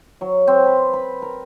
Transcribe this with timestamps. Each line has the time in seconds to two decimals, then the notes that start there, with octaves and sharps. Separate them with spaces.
0.21 F#3
0.47 C4
0.66 B4
0.93 B5
1.22 A#4